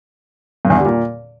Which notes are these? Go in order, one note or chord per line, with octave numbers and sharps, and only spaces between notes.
G2
E2
D3
G3
A#2